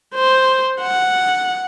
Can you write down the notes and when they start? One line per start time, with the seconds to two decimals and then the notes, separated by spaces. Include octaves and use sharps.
0.14 C5
0.81 F#5